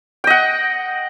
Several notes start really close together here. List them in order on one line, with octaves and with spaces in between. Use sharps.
G5 D#5 F#5